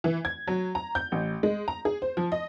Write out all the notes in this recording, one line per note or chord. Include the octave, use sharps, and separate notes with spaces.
E3
G#6
F#3
A#5
G6
A1
G#3
A#5
G#4
C5
F3
D#5